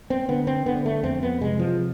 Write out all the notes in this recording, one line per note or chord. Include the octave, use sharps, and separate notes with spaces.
C4
D3 B3
C4
D3 B3
A3
F2 C4
B3
C3 G#3
F3